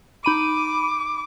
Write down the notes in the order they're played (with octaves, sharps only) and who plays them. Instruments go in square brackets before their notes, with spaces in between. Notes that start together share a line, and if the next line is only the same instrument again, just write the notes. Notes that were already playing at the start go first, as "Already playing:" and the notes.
[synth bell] D#4 B5 D#7 [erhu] D6